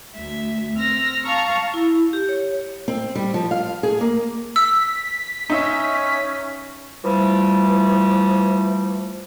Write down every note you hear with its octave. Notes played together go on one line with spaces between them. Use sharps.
D2 E5
C4 E6 F6 A#6
F5 A5 A#5 C#6 F6
E4
G4
C#5
C4
G3
F3
F5
G#4
A#3
E6 B6
C#4 D#4 E5
E3 F3 G3 A3